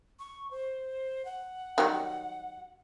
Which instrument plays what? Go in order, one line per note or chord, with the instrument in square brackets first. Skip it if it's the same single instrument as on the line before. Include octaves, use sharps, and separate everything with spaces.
[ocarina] C#6
C5
F#5
[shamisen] D#3 F#3 G3